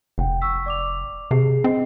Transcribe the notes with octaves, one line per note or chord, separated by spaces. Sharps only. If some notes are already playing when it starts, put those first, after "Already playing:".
F1 F#5 G5
C#6 E6 B6
D5 D6 F7
C3 G#4 C7
C4 D#5 C7